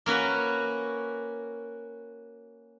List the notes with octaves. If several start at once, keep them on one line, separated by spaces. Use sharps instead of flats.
A#3 C#4 F#4 B4